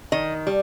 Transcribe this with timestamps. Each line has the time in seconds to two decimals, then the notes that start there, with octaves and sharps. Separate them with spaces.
0.12 D#3 D#5
0.47 G3